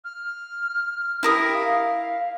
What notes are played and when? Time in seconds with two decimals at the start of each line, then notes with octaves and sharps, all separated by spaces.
0.04 F6
1.23 E4 G4 A#4 D#6
1.54 F5